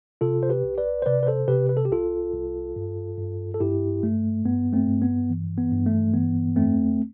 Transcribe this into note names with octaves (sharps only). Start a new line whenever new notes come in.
C3 F4 A4
C5
G4 B4
C2
B4 D5
C5
C3 B4 D5
B4
A4 C5
C3 G4 B4
B4
A4
G4
C2 F4 A4
C2
G2
G2
A4
G2 E4 G4
G2 A3
G2 B3
A3 C4
G2
B3
E3
B3
G2
A3
E3 B3
F2 A3 C4